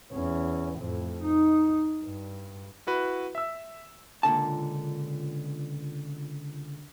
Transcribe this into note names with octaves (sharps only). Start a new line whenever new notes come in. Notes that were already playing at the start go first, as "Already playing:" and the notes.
E2 C#4
F2 A2
D#4
G2
E4 F#4 B4
E5 E6
C#2 A#2 D3 A5